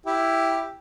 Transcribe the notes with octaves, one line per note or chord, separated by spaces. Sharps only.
E4 G4